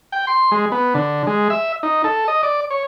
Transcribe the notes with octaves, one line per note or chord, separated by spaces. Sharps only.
G5
C6
G#3
B3
D3
G#3
E5
D#4
A4
D#5
D5
C#5